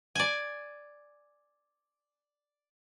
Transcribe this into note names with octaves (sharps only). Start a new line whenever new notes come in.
D5 G#5